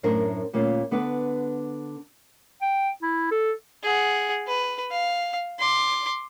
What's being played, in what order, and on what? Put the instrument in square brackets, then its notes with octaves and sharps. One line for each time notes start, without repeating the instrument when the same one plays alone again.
[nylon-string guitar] F#2 A2 A3 D4 A#4 C5
D2 A#2 A#3 C#4 F4
D3 B3 D4 A4 B4
[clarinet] G5
E4
A4
[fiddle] G#4 F#5
B4
F5
C6 D6